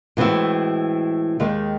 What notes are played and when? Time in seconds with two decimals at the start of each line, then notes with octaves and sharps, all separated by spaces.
0.17 A2 E3 G#3 C4 F#4
1.40 D#2 D#3 G#3 D#4